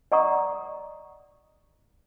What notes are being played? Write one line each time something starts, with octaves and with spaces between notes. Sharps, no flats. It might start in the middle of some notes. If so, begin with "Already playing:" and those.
D5 D#5 F#5 A#5 C#6 D#6